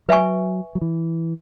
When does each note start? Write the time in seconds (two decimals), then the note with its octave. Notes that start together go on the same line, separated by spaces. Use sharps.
0.08 F#3 B4 E5 G#5 C#6
0.75 F#3
0.81 E3